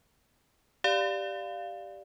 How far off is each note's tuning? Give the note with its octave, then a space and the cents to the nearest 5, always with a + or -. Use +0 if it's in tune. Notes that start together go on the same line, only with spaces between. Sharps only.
G4 +0 D5 +0 F5 +0